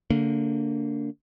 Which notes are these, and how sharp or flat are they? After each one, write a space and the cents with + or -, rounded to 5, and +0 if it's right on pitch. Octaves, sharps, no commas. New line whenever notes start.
D3 -25 A#3 -30